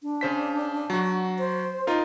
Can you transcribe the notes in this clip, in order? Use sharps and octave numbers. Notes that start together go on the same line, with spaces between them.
D4
C#3 C5 B6
F#3 F#4
C5
D#4 F4 A#4